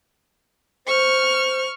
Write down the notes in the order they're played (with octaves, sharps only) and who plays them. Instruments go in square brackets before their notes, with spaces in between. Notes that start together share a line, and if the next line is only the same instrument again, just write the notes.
[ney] C5 [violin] C#6 F6